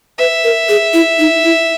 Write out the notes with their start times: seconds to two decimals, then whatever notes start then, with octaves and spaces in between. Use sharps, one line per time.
0.18 B4 E5
0.44 A#4
0.69 G#4
0.94 E4
1.19 D#4
1.44 E4